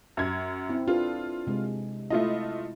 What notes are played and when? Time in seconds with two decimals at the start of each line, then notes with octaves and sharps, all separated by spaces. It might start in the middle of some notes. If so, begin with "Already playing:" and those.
0.17 F#2 G#6
0.69 C4 E4
0.88 D4 F4 A4 B4
1.47 C3 G#3
2.10 A3 E4 F4 D#5